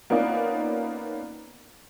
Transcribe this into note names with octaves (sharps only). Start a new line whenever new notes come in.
A#3 B3 C#4 D#4 F4 D5